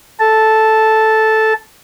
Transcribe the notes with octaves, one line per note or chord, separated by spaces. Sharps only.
A4 A5